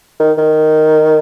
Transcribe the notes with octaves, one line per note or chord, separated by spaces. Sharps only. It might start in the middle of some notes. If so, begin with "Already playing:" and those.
D#3
D#3